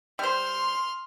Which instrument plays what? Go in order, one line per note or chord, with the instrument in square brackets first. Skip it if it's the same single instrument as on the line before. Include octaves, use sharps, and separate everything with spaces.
[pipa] G3 C5 [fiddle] C6 F6